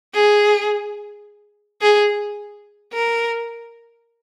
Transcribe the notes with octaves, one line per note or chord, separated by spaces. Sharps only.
G#4
G#4
A#4